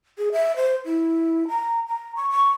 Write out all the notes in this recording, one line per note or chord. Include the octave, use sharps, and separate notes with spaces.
G#4
E5
C5
E4
A#5
A#5
C#6
C#6